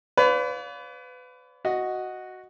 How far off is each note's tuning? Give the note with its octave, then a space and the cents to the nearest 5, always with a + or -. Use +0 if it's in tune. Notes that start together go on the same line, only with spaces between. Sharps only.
B4 +25 D5 -45 F5 +20
F#4 +0 D#5 +0